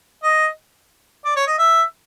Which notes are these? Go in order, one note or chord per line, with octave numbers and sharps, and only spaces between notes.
D#5
D5
C#5
D#5
E5